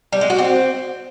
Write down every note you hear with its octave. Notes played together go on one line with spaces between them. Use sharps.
G3
G#3
F#4
C4